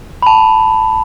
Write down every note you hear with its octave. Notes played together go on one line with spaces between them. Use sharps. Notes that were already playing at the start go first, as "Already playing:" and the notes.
B5
A5